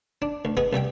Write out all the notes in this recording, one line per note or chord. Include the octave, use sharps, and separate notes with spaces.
D4
D2
B3 G#4 D#5
C2 G3 E5 G5